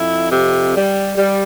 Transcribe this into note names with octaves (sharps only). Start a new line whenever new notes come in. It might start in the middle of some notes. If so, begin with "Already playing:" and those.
Already playing: F2 E4
C3
G3
G3